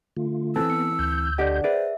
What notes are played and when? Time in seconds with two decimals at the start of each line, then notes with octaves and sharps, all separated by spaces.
0.17 D3 A3 F4
0.56 E3 C4 A4 E6
0.70 B3 C#7
0.99 D2 G6
1.38 D3 G4 D5 D#5 F#5
1.64 G#4 B4 C5 D5 E5